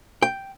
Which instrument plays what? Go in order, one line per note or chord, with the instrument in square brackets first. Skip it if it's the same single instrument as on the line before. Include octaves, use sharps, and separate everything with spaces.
[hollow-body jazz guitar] G5